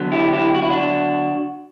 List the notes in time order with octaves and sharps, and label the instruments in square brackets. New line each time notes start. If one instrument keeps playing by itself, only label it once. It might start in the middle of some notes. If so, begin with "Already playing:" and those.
Already playing: [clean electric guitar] D3 F#3 B3
E4 G4
E4 G4
F#4
E4
D4 F#4